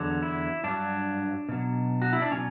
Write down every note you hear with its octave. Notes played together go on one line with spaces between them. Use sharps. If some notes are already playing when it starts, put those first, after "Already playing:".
Already playing: E2 D3 F#3
E4
G2 F#3 D4
B2 F#3
F#4
E4
D4
B2 F#3 C#4